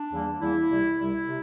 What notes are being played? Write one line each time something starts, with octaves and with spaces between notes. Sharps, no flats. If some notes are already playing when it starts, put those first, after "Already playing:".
Already playing: D4
E2 E3 G3 A#3
E2 E3 G3 A#3 E4
C2 C3 G3
C2 C3 G3 E4
C3